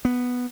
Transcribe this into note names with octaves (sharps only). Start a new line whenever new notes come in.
B3